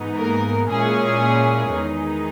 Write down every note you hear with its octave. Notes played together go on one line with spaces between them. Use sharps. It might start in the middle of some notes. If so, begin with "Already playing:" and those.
Already playing: G#2 E3 G#3 B3 D#4
A#3 A#4
A#2 G#3 C#4 E4 G#4
E2 D#3 G#3 D#4